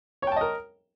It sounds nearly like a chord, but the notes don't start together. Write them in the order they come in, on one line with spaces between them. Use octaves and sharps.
C#5 G5 A5 D#5 A#4